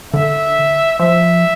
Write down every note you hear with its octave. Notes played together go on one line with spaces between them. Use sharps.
D3 E5
F3 E5